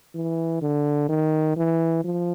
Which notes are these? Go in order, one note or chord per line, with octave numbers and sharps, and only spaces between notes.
E3
D3
D#3
E3
F3